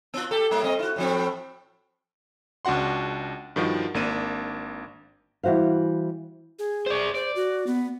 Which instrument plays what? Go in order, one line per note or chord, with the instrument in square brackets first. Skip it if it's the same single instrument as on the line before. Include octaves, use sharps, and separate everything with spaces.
[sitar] B3 F4
G4 A4
A2 G3 A#3
C4 D#5
E4 F#4
A2 F3 C4
[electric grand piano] C#2 D4 F#4 F#5 C6
G2 D#3 F3 F#4
G#1 A#3 D4 D#7
[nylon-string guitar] E3 G3 F#4 C5 F5
[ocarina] G#4
[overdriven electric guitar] C5 D5
[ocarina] C5 [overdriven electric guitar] D5
[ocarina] F#4
B3